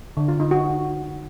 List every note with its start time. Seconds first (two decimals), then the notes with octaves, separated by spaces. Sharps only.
0.17 D3
0.28 F4
0.40 D#4
0.51 F#4